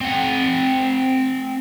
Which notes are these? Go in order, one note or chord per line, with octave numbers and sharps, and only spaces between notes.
C4 F#5